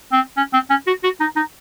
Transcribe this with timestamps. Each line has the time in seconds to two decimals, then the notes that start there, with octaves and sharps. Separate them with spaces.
0.12 C4
0.37 C#4
0.54 C4
0.70 C#4
0.87 F#4
1.04 F#4
1.20 D#4
1.36 D#4